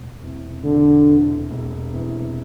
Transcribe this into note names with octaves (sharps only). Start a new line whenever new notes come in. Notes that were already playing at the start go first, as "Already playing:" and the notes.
Already playing: E1
E2 C3
E1 D3
E2 C3
E1
E2 C3